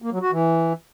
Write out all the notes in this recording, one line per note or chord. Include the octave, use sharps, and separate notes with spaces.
A#3
F#3
F#4
E3